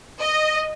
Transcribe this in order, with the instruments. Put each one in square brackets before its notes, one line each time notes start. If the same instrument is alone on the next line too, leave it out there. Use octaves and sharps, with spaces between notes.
[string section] D#5